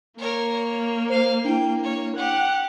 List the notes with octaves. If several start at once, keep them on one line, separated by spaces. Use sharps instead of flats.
A#3 A#4 C#5
C#5
C5 F5
D4 E4 G5
C#5
G4 F#5